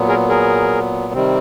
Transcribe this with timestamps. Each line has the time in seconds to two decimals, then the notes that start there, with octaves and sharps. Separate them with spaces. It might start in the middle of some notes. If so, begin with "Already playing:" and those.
Already playing: A#2 F#3 B3
0.08 G#4 A#4
0.29 G#4 A#4
1.13 C3 D#3 G3 C4